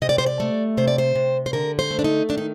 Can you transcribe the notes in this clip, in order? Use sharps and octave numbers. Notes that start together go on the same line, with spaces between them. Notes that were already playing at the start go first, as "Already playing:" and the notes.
C3 D#5
D5
C5
D5
A3
C3 C5
D5
C5
C3
C5
D3 A#4
C5
A3
D4
D#4
D#3 D4
D#4